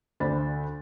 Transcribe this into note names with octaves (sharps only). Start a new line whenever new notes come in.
D2 C5 D5 B5 A6